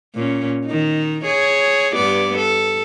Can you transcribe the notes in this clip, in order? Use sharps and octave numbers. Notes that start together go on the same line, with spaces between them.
A#2 C#4
D#3 D#4
G#4 C#5
G2 B3 D5
A4